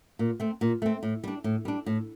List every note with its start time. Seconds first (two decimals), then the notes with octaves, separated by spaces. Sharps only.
0.19 A#2
0.40 A3 C4
0.61 A#2
0.82 A3 C4
1.03 A2
1.24 G3 D4
1.44 A2
1.65 G3 D4
1.86 A2